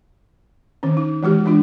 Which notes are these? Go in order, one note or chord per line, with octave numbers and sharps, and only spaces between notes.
D#3 C#4
D#4
E3 G#3 F#4 G4
E3 G#3 D4 F4